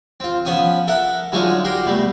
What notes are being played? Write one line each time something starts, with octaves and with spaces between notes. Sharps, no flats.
C4 F4
F3 B3 C#4 G#5 D#6
A4 A#4 E5 F#5
D3 F#3 G#3 D#4 F4 C#5
F#4 G4 A#4 C6
B2 G3 A3